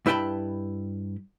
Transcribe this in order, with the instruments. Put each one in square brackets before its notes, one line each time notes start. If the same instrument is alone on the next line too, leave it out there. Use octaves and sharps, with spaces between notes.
[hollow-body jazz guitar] G2 E4 B4 G5 A5 B5